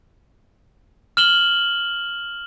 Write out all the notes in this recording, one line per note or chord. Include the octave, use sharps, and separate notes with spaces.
F6 E7 F#7 G7